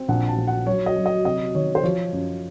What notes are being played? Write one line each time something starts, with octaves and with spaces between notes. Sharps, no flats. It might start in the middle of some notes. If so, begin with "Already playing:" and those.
Already playing: C4
A#1 F#5
A5
A#1
F#5
F#3 C#5
D#5
F#3
D#5
C3 D#5
D#3 C#5
C5
F3 C#5
F#2